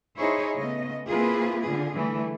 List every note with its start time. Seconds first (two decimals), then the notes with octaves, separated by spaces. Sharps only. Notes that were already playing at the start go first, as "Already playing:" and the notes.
0.19 D#4 E4 G#4 C5 C#5
0.57 C#3 A3 B3 D#5
1.10 A#3 C4 E4 F4 G#4 B4
1.65 D3 F4 G#4
1.96 D3 E3 G3 A3